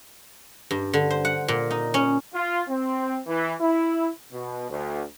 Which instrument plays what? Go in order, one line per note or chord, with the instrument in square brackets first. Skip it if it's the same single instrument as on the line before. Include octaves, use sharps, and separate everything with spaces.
[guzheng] G2
D3
C5
F#5
A#2
D#4
C#4
[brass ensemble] F4
C4
E3
E4
B2
D2